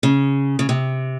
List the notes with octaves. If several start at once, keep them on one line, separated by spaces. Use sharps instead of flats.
C#3
C#3
C3